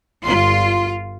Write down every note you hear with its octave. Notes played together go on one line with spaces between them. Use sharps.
G1 F4 C6